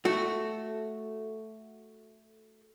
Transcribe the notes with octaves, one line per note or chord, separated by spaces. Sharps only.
A3 F#4